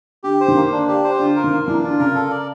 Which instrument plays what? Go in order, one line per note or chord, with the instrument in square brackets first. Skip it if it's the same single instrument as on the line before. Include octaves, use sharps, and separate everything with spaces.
[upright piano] D3 [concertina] G4
[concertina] C5
[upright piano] D#3
[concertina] A#3
[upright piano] D3 [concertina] D4
[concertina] G4
C5
[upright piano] D3 [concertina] F4
[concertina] A#4
[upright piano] D#3
[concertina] A#3
[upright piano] E3 [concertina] D4
[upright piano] D3 [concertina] F4
[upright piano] C#3 [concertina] A#4
[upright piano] C#3 [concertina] A4
[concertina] D5